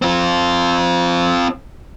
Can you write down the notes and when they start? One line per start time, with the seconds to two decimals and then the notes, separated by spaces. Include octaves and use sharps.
0.02 C4 F4